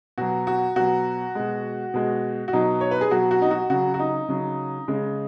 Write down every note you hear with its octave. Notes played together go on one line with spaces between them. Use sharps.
B2 F#3 F#4
F#4
B2 F#3 F#4
B2 G#3
B2 G#3
F#4
B2 F#3 D#4
C#5
B4
G#4
B2 F#3 F#4
F#4
D#4
F#4
C#3 F#3 F#4
F#4
D#4
C#3 F#3
C#3 G#3